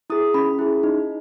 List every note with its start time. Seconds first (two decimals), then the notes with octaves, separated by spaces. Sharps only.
0.10 E4 G#4 D#6
0.34 C#4 B5
0.59 E4 G#4
0.83 D#4